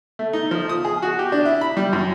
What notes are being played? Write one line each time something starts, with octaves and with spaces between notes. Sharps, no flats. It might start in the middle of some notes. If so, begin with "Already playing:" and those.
A3
D#4
F3
D#6
G#4
F#4
G4
D4
E4
B5
G3
F#2